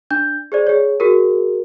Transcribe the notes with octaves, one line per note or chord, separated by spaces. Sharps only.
D4 G6
G#4 C5 D5
G#4 C#5
F#4 G#4 A#4